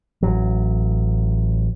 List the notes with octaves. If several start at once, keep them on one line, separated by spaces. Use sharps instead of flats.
A1 F#3